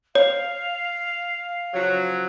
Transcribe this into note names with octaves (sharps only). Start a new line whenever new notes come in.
C#5 F5
C#3 F3 F#3